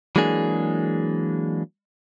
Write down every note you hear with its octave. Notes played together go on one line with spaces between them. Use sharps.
E3 F#3 G#3 A#3 D4 G#4